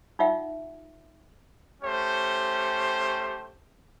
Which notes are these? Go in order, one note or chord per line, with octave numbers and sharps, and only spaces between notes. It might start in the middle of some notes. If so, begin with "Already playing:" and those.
D#4 F4 E5 F#5
A3 C#4 G4 C5